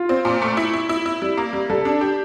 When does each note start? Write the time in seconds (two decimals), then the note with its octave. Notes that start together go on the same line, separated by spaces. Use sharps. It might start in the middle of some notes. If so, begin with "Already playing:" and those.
Already playing: F4
0.09 C4
0.25 A#2
0.42 A3
0.57 E4
0.73 E4
0.89 E4
1.06 E4
1.22 G3
1.37 A#3
1.53 G3
1.70 G3 A4
1.85 D4
2.01 G4